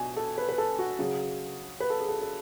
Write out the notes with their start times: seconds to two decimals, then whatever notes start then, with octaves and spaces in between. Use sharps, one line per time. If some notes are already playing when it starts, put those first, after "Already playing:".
Already playing: B2 G#5
0.17 A4
0.38 B4
0.49 B4
0.58 A4
0.79 F#4
0.99 C#3 F#3 G#4
1.80 B4
1.90 A4
1.99 G#4
2.08 A4
2.21 A4